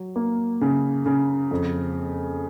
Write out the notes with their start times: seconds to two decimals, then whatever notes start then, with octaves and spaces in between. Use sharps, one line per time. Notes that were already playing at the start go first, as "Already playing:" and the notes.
Already playing: F#3
0.16 A#3
0.61 C#3
1.06 C#3
1.51 F2